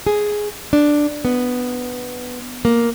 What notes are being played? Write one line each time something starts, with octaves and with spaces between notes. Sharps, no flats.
G#4
D4
B3
A#3